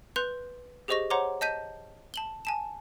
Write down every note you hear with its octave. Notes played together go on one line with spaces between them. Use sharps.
B4 C6 F#6 G6 F7
G4 G#4 C5 D#5 C#6 A#6
C5 C#5 F#5 A#5 C6 D6
D#5 A5 G6 B6 D#7
A5 F#7 G7
G#5 A5 E7